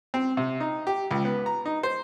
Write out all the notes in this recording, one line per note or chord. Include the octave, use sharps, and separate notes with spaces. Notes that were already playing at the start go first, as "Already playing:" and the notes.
C4
C3
D#4
G4
C#2
B3
A#5
D#4
C5